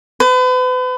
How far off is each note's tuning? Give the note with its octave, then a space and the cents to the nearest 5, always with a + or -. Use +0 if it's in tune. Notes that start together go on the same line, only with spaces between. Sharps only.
B4 +40